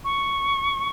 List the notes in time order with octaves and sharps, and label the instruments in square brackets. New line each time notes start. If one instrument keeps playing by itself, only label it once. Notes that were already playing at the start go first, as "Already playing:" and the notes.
[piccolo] C#6